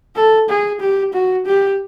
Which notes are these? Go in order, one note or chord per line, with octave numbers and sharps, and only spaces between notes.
A4
G#4
G4
F#4
G4